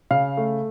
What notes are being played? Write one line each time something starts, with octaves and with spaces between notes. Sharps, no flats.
C#3 F5
A3